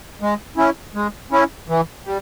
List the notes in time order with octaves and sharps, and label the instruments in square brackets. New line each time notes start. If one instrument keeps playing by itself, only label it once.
[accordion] G#3
C#4 E4
G#3
C#4 E4
E3
G3